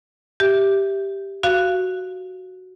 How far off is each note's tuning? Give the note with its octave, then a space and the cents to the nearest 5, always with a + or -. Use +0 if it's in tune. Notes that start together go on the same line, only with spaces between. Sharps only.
G4 +0 E5 +0
F#4 +0 F5 -15